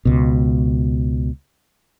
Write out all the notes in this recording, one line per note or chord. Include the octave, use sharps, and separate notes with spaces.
C#2 B2